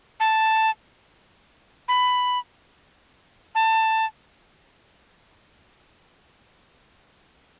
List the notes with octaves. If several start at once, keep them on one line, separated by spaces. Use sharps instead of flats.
A5
B5
A5